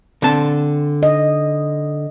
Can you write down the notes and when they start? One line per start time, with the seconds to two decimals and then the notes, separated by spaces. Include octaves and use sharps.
0.22 D3 C4 A5
1.03 D#5